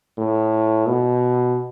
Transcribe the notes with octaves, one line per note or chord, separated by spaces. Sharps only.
A2
B2